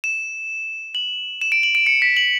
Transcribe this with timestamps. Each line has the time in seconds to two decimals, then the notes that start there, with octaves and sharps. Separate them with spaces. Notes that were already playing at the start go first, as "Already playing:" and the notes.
0.04 E7
0.95 F#7
1.41 E7
1.52 D7
1.63 F#7
1.75 D7
1.87 C#7
2.02 B6
2.17 F#7